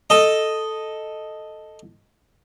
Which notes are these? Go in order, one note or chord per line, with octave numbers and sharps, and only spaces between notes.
A4 D#5